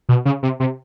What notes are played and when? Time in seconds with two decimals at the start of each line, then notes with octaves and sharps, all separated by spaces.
0.09 B2
0.25 C#3
0.43 C3
0.60 C3